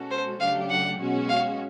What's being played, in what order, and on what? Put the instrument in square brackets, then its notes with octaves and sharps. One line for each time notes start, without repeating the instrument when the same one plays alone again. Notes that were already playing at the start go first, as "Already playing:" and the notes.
Already playing: [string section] B2 G#3 C#4 F#4 A4
[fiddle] C5
[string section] C#3 F#3 A3 D4 G4 [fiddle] F5
[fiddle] F#5
[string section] B2 G#3 C#4 F#4
[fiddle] F5